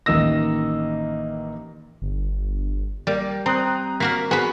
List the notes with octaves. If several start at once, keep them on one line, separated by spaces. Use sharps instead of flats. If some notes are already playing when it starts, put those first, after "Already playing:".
A1 D#3 A#3 D#5 E6 A#6
G1
G3 A#3
C4 A#5 D#6 F#6
A#3 F#4 A#4 B6
B3 F#4 G#4 B4